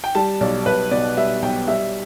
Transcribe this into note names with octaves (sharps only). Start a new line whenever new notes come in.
G5
G3 A5
B1 D5
B1 B4
B2 D5
G3 E5
B1 G5
G3 E5